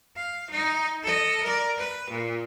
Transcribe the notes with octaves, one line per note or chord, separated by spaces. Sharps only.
F5
D#4
A4 D#5
A#4 D5
B4
A#2